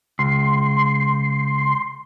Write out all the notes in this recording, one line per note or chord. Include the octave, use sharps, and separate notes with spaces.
C#2 C6